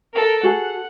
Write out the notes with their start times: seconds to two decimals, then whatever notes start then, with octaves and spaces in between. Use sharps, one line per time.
0.14 A4 A#4
0.43 F#4 G#4 A4 F#5